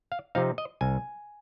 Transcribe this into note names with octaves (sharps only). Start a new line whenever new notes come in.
F5
C3 F3 C4 D#4 F5
D#5
C2 G#5